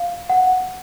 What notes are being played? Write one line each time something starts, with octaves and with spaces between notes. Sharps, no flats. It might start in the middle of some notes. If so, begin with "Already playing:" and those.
Already playing: F5
F#5